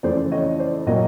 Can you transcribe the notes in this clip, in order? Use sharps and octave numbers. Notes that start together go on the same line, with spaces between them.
F2 C#3 E3 A3 C5 D5
C#5 D#5
C5 D5
A#2 F#3 A#3 C#5 D#5